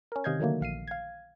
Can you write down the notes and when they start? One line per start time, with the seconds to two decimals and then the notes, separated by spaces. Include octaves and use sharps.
0.12 C#4 A#4
0.24 C3 D#3 D#5 F5 G6 G#6
0.40 D3 D#3 F#3 A3 A#3
0.61 A#1 F5 C7 D#7
0.87 F5 G#6